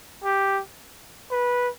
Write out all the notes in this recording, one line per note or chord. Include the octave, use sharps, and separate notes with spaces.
G4
B4